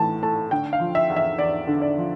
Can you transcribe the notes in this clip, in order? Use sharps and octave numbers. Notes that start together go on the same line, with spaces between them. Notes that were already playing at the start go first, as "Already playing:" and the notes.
Already playing: A2 E3 A5
A3 A5
D3 G5
F5
F3
E5
E2
E5
E2 D5
D3
D5
F3